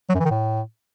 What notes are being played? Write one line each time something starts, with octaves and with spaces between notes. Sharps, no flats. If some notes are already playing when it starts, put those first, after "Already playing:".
F#3
F#2
E3
D#3
A2